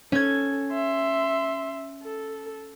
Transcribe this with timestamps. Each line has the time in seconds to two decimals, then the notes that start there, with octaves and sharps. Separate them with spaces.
0.12 C#4 A4 G#6
0.72 E5 C6
2.03 A4